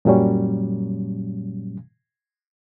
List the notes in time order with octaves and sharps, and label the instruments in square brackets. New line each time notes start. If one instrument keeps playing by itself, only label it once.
[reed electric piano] F#2 A#2 F#3 G3 C#4